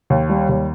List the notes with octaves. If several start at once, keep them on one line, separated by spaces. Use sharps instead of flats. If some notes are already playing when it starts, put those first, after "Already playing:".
D#2
G3
D#2